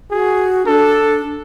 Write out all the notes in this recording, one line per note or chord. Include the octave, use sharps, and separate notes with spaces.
F#4 G#4
D4 A4